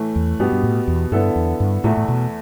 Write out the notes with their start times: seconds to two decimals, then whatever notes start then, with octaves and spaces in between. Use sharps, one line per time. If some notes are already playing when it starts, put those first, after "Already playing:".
Already playing: A2 E3 A3
0.16 E2
0.40 G2 B2 B3 G4
0.52 G2
0.63 A2
0.88 E2
1.12 G2 D3 B3 E4 A4
1.36 E2
1.60 G2
1.84 E2 A2 E3 A3 E4
1.97 A2
2.08 B2